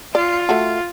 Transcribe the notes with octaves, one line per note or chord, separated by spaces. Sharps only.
F4 D5
A3 F#4